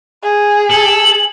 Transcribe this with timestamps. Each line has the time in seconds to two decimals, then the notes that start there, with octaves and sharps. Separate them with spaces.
0.24 G#4
0.70 A4 F#7